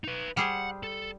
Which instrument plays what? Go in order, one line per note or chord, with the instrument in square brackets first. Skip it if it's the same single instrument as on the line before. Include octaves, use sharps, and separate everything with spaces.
[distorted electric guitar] D#4 B4
[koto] G3 G#4 C5 [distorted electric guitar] F#5
[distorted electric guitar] A4